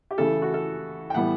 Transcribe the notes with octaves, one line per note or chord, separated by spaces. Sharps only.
G4
C#3 E3 A3 A4
F#4
A4
G5
A2 E3 G3 B3 F#5